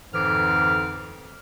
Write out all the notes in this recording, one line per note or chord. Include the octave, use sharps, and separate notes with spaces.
F2 G#2 D3 E3 D6 F6